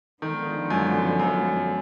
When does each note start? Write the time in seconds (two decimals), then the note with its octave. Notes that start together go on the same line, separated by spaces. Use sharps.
0.22 D3 D#3 F3 G#3 B3
0.70 F#2
1.20 F#2